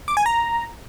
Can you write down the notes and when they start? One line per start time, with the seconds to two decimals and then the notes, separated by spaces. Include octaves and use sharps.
0.08 D6
0.17 G#5
0.26 A#5